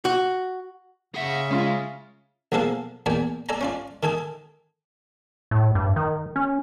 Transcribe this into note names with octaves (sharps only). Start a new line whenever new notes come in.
F#4
C#3 G#4 E5 F#5 C#6
G#3 C#4 F4
B1 F3 A#3 G#4 A4 F5
E2 A#2 D5 G5 G#5
A4 D5 G#5 A#5
C#4 F4 D5
D#3 A4 G#5 D#6
A2
G2
D#3
C#4